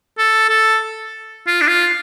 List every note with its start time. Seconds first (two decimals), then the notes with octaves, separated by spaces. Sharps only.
0.18 A4
0.49 A4
1.47 F4
1.61 D4
1.67 F4